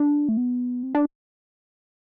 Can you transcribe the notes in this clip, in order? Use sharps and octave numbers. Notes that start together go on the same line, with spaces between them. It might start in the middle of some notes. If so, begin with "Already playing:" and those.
Already playing: D4
A3
B3
C4
D4